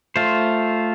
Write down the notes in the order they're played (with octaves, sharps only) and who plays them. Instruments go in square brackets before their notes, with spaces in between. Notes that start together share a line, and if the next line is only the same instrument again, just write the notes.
[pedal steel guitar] A3 F4 C5